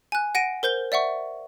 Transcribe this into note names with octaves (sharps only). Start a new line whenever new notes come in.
G#5 F#6
F#5 A#6 D7 D#7
A#4 C5 G6 G7
D5 E5 F#5 C#6